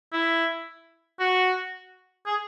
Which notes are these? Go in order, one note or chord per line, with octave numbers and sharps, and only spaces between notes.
E4
F#4
G#4